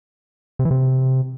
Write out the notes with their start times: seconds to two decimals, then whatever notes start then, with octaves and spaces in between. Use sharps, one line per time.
0.59 C3
0.65 E3
0.71 C3